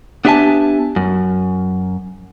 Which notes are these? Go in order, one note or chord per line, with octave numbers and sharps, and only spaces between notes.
B3 D4 G4 E5 G#5 A5
F#2